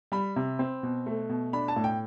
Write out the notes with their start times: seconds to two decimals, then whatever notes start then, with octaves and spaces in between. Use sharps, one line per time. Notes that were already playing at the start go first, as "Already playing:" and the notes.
0.12 G3 B5
0.36 C3
0.59 C4
0.83 B2
1.06 A3
1.29 B2
1.53 D4 B5
1.68 A5
1.76 A2
1.84 G5